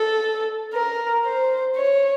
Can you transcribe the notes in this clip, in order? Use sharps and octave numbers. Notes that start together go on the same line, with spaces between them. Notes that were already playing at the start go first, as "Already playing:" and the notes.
Already playing: A4
A#4
C5
C#5